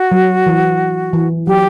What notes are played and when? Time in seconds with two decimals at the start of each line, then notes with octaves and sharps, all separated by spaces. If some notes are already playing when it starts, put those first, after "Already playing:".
Already playing: F#4
0.12 F#3
0.46 E3
1.13 E3
1.47 F#3 G4